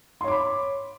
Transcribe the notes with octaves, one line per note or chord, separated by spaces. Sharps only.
C#5 B5 C6 D6